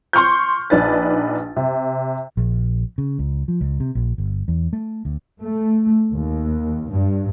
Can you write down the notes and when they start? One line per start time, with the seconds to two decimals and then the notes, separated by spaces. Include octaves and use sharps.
0.13 C6 C#6 F6 G6
0.70 A#1 D4 D#4 B4 A6
1.56 C3
2.37 A#1
2.98 C#3
3.19 C#2
3.48 F3
3.61 C#2
3.80 C3
3.95 A#1
4.18 G1
4.48 E2
4.73 A3
5.05 D2
5.41 A3
6.12 D#2
6.91 G2